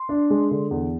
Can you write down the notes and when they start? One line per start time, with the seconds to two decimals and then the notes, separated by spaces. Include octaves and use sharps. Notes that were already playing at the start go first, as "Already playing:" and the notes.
Already playing: C6
0.09 D4
0.30 G#3
0.51 D3
0.71 E2